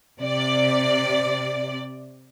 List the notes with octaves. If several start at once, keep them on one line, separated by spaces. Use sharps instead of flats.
C3 D5